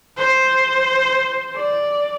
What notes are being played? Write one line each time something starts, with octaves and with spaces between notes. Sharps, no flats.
C5
D5